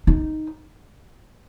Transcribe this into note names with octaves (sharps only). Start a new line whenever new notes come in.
D#4